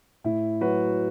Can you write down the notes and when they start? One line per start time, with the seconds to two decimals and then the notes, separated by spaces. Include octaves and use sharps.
0.24 A2 E4
0.61 F#3 F#4 B4